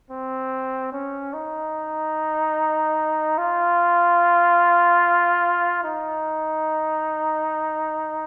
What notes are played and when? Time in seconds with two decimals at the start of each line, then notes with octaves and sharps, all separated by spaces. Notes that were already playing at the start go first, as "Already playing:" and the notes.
0.10 C4
0.93 C#4
1.33 D#4
3.38 F4
5.84 D#4